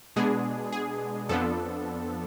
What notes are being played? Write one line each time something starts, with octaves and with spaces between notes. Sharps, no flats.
B2 G#3 B3 D4 G#4
G#4
F2 F3 B3 D4 A4